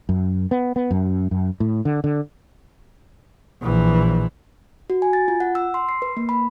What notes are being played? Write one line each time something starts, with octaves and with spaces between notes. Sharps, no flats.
F#2
B3
B3
F#2
F#2
A2
D3
D3
A#1 E3
F#4
G#5
A6
F4
F#5
E6
C6
C7
B4
A#3
B5